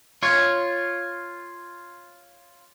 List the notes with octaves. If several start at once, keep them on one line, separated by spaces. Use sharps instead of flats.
F4 C#5